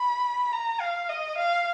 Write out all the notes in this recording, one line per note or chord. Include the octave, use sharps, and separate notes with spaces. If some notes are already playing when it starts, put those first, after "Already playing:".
Already playing: B5
A#5
F5
D#5
F5